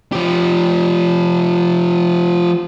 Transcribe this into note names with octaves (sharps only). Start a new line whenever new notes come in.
F3 G4